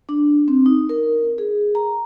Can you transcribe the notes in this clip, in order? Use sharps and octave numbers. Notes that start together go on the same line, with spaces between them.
D4
C4
D#4
A#4
G#4
A#5